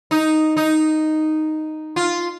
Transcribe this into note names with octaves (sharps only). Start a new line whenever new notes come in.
D#4
D#4
F4